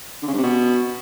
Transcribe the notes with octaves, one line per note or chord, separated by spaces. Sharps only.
D3
C#3
G2
C3
B2